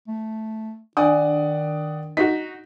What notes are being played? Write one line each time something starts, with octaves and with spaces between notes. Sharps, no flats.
A3
D#3 D4 D5 F#5 G#5 D#6
D#4 F#4 B6